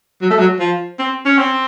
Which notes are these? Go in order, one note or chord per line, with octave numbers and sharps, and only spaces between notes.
F#3
A3
F#3
F3
C4
C#4
C4